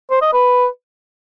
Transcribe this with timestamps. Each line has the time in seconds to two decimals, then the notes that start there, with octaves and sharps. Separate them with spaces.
0.11 C5
0.22 D#5
0.33 B4